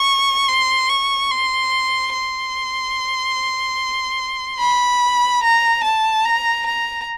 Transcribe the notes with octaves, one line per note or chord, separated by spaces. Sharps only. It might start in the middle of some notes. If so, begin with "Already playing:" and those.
Already playing: C#6
C6
C#6
C6
C6
B5
A#5
A5
A#5
A#5